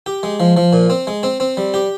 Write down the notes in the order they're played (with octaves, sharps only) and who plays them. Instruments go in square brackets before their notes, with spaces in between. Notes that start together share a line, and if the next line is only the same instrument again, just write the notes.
[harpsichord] G4
G#3
F3
F3
A#2
C4
G#3
C4
C4
G3
G4